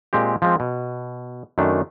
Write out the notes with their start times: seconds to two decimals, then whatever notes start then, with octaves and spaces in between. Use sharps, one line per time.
0.13 A#2 G#3 C4 G4
0.42 F3 G#3 C4
0.60 B2
1.58 F#2 D#3 A3 D4